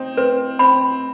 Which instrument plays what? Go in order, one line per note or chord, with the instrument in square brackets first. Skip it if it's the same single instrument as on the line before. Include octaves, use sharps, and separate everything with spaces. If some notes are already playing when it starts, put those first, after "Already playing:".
Already playing: [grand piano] C4 D#4
[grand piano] C4 [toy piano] B4
[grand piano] C4 [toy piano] B5